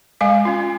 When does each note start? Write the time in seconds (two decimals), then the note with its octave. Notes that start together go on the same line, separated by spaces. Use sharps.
0.21 G#3 F5 G#5
0.45 C#4 F4